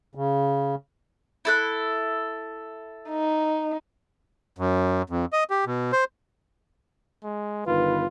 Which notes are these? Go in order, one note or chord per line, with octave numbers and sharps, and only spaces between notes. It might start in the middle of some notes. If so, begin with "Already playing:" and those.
C#3
E4 A4 F#6
D#4
F#2
F2
D#5
G4
B2
C5
G#3
G1 D#3 F4 B4